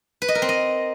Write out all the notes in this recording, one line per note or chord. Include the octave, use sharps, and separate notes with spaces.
B4
D#5
A#4
C4
D#5